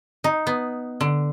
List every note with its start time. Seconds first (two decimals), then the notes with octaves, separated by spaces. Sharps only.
0.24 D#4
0.47 B3
1.01 D3